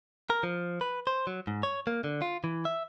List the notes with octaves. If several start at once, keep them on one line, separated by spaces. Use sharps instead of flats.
A#4
F3
B4
C5
F#3
G#2
C#5
A#3
D3
F4
E3
E5